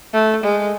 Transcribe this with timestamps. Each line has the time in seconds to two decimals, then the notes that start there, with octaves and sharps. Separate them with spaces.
0.13 A3
0.43 G#3